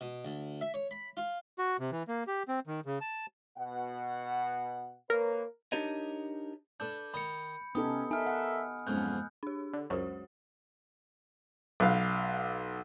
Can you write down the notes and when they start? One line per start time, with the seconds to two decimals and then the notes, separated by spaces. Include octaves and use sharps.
0.01 B2
0.25 D2
0.61 E5
0.74 C#5
0.91 B5
1.17 F4
1.59 F#4
1.80 C3
1.92 E3
2.08 A#3
2.27 G4
2.48 C4
2.67 D#3
2.86 C#3
3.01 A5
3.58 B2 F#5
5.10 A#3 A#4 B4 C#5
5.72 D4 D#4 G4 A#4 C#5 D#5
6.80 D4 A4 B4 G6
7.14 D#3 D#5 B5 C#7
7.75 C3 B3 C#4 D#4 G4 A4 D#6
8.11 D#4 A4 A#4 E5 G#5 F6
8.26 F#5
8.87 F2 G#2 B2 F3 F#3 C#4 F#6 G6
9.43 D4 G4
9.73 D3
9.90 C#2 F#2 F#3 F#4 C5
11.80 B1 B4 F5